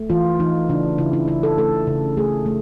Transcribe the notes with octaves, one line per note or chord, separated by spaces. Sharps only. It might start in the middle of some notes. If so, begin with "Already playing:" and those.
Already playing: A3
E3 F4
E3 D#4
C#3 D4
C#3 E4
E4
C#3 E4
A4
A3 A4
C#3
A3 G#4
A3